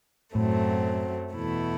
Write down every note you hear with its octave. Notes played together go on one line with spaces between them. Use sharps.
F#2 A2 F#3 A3 C4
E2 B2 A3 E4